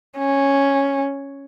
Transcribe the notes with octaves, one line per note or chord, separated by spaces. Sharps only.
C#4